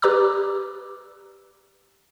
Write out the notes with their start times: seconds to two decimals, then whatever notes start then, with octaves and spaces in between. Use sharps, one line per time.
0.02 G4 B4 D5 A#5 D6 E6